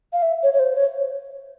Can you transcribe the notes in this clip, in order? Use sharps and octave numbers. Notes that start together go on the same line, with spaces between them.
F5
E5
C#5
C#5
C5
C#5